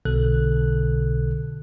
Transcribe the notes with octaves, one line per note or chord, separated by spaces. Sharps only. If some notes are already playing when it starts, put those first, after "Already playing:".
B1 B2 D3 A4 F#6